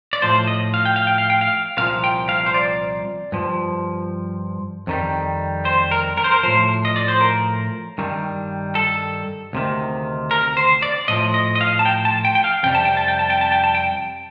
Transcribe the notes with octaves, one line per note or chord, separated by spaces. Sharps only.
D5
A2 F3 C5
D#5
F5
G5
F5
G5
F5
G5
F5
C2 A#2 F3 F5
G5
F5
C5
D5
G2 F3
F2 D#3 G3
C5
A#4
A#4
C5
A#4
A2 F3 C5
D#5
D5
C5
A#4
G2 D#3 G3
A4
D2 C3 D#3
A#4
C5
D5
A2 F3 D#5
D#5
D#5
F5
A5
G5
A5
G5
G5
F5
F2 C3 G3 G5
A5
G5
A5
G5
A5
G5
A5
G5
A5
G5